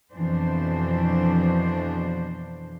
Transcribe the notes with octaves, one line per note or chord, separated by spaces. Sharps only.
F2 B2 E3 F3 D4 C5